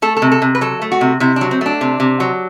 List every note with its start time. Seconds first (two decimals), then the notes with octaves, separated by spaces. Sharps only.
0.02 A3 A4
0.17 A4
0.22 C3
0.32 A4
0.42 C3
0.55 B4
0.61 F#3 A4
0.82 A3
0.92 F#4
1.01 C3
1.20 C3 E4
1.36 F#3 D4
1.51 C4
1.61 A3 D4
1.81 C3
2.00 C3
2.20 F#3